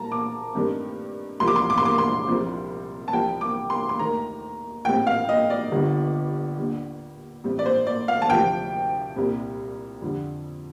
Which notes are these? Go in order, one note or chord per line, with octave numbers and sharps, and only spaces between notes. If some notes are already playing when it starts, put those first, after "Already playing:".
Already playing: A#2 G3 A#3 A5 A#5
D6
G2 D#3 A3 C4
C2 C3 F3 C6
D6
C6
D6
C6
D6
C6
C2 C3 F3 C4
A5
C2 C3 F3 G5
D6
C6
C6
D#2 D#3 A3 A#5
A#1 A2 G3 C4 G5
F5
D#5
D5
G1 G2 D3 G3
D#2 D3 G3
A1 A2 G3 C4
D5
C5
D5
F5
A5
D2 C3 F3 G5
C2 A#2 G3 C4
F2 D3 G3